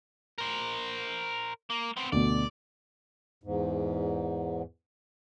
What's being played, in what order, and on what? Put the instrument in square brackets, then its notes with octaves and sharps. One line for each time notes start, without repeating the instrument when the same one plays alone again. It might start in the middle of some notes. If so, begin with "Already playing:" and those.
[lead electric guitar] A#4 C5
A#3
B3 C4
[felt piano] D2 B2 [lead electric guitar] D5
[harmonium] E2 G#2